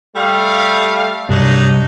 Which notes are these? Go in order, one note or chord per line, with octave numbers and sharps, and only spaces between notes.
G3 A3 F5
C2 G2 F#3 D4 D#4